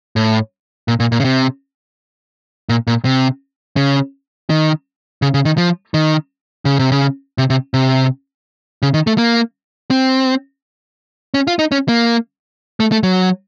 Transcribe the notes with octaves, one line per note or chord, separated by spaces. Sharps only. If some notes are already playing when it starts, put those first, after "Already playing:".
A2
A#2
A#2
A#2
C#3
C3
A#2
A#2
C3
C#3
D#3
C#3
C#3
D#3
F3
D#3
C#3
C3
C#3
C3
C3
C3
C#3
D#3
A3
A#3
C4
C#4
F4
D#4
C#4
A#3
A3
A3
F#3